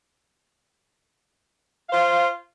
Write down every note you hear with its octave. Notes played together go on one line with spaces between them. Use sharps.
F4 C5 F5